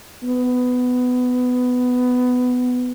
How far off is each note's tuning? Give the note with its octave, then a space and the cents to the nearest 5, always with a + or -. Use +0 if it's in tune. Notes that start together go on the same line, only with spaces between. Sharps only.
B3 +15